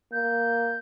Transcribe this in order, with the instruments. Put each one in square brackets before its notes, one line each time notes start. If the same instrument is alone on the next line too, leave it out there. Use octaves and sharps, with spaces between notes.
[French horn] A#3 [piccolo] G6